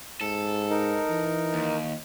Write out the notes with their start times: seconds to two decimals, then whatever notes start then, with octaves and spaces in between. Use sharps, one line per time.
0.21 G#2 A4
0.70 D#4 A#4
1.10 E3
1.54 D#2